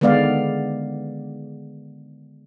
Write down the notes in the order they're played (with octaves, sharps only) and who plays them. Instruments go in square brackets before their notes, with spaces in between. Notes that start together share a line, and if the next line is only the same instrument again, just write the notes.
[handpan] D3 D#3 G#3 B3 D5 F5